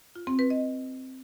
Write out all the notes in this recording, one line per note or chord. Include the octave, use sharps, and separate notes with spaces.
F4
C4
B4
D#5